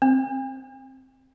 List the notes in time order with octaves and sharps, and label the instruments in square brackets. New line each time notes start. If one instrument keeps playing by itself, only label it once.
[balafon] C4